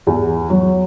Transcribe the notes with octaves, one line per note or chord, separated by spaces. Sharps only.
E2
F#3